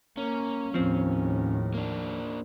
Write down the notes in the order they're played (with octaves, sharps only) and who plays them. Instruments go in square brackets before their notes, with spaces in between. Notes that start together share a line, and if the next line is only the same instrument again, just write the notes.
[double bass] A#3 [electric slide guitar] C#4
[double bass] D#2 A2 [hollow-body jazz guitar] F3 C4
[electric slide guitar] A#3 D4